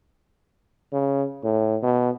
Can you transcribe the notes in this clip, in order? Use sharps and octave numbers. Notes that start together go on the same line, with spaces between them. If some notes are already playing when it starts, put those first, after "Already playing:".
C#3
A2
B2